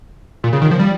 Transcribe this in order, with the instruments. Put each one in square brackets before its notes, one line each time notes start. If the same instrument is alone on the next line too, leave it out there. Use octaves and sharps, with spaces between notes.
[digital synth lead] A#2
C#3
D#3
F3
G3